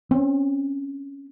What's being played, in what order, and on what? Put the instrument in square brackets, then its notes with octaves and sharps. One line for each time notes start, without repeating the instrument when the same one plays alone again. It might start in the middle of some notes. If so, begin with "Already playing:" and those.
[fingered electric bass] C4 C#4